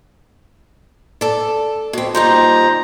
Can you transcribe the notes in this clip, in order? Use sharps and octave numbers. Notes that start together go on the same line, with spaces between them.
A4 D5
B2 C4
A#2 G3 D#4 C5 A#5